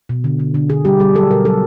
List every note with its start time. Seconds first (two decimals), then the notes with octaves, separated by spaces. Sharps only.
0.09 B2
0.24 D3
0.39 D3
0.54 D3
0.70 D3 G#4
0.85 G3 G4
1.00 G3 G#4
1.15 F#3 A4
1.31 B2 A#4
1.45 F#3 A4